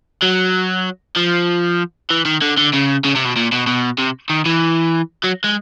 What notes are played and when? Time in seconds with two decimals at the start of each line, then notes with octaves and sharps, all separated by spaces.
0.22 F#3
1.16 F3
2.11 E3
2.25 D#3
2.42 D3
2.57 D3
2.73 C#3
3.04 C#3
3.15 C3
3.25 B2
3.36 A#2
3.52 B2
3.67 B2
3.98 C3
4.30 D#3
4.46 E3
5.24 F#3
5.45 G#3